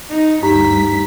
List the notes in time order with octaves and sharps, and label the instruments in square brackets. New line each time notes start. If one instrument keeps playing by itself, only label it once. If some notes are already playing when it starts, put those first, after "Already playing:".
[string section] D#4
[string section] D2 G2 B6 [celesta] D#4 G4 A#5